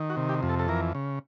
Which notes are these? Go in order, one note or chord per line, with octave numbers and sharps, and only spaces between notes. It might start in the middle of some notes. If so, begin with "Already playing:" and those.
Already playing: D#3
F#4
C3
G4
F2
A4
A4
E3 A#4
C#3